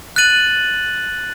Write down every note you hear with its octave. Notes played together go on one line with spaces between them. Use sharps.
F#6 A6 D#7 F#7